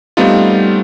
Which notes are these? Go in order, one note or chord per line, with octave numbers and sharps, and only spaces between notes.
G3 A3 B3 C4 D#4 F4